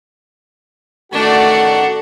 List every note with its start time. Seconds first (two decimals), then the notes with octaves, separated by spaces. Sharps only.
1.13 A1 D#3 A3 D4 F#4 D5 F#5